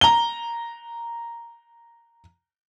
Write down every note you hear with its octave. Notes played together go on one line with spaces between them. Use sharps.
A#5 G7